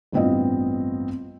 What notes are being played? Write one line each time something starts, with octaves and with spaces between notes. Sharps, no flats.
A1 G2 B3 C4 F4 D#5